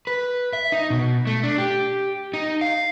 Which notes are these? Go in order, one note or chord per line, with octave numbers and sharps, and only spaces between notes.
B4
E5
D#4
B2
A3
D4
G4
D#4
F5